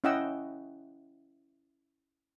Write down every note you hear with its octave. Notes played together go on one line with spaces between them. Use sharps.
C#4 E4 D#5 F#5 G5 E6